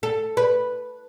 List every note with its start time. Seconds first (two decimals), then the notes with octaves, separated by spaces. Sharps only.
0.03 A4
0.37 B4